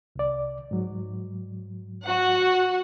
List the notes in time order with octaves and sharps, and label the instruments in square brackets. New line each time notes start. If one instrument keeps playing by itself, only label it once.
[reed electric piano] C2 D5
G#2 F#3
[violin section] F#4 F#5